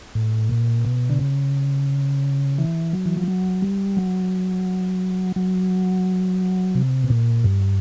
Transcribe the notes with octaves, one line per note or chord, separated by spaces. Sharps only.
A2
A#2
B2
D3
C#3
E3
F#3
E3
F3
F#3
G3
F#3
F#3
C3
B2
A#2
G2